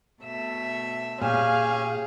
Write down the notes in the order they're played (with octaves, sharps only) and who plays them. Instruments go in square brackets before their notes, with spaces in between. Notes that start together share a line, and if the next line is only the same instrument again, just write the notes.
[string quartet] B2 A3 E5
[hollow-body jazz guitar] A#2 [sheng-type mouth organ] C#4 G4 G#5 [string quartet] G#4 [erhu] F5